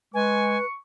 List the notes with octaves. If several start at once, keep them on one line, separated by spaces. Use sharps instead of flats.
G#3 B4 G#5 C#6